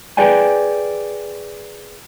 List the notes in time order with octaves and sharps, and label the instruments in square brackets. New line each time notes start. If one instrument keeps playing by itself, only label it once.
[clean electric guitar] G#4 B4 D5 G5 G#5